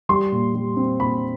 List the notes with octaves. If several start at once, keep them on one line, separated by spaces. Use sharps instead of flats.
G3 C6
A#2
G3
C4
A#2 B5